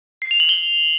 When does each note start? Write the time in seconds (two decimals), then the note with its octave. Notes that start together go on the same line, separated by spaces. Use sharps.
0.22 C7
0.31 F7
0.40 F#7
0.49 G7